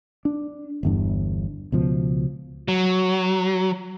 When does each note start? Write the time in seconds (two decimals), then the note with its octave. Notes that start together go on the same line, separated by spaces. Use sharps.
0.25 D4
0.83 G1 E2 G2
1.72 C#2 B2 F3
2.68 F#3